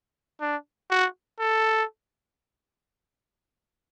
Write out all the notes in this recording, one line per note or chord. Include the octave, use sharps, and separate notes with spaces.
D4
F#4
A4